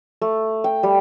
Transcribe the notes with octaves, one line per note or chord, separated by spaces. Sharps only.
A3
G5
G3